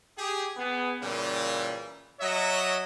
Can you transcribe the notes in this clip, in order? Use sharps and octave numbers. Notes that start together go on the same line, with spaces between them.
G4 G#4
B3 G#4
A#2 C#3 E3 G3
F#3 C#5 D#5 E5